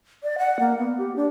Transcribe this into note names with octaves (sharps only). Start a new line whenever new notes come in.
D5
F#5
A#3
B3
G4
D4